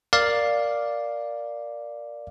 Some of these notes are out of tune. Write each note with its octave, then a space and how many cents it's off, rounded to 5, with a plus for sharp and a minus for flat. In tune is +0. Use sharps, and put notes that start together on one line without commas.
A#4 +5 D5 +0 F5 +0